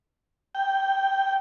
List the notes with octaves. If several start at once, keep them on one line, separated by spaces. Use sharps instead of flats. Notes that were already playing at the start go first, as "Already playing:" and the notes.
G5